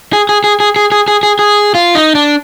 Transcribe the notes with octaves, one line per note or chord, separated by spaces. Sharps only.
G#4
G#4
G#4
G#4
G#4
G#4
G#4
G#4
G#4
F4
D#4
D4